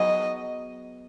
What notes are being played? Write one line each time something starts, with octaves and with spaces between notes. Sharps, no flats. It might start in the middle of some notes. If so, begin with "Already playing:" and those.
Already playing: F#3 B3 D#4 G#4 D#5